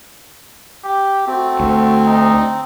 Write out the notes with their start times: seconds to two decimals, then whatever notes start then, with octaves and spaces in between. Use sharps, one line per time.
0.84 G4
1.27 A3 C4 F#4
1.60 D2
2.06 D#4